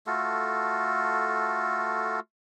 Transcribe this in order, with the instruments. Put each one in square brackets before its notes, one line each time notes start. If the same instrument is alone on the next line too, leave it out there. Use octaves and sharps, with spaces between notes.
[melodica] A3 F4 F#4 A4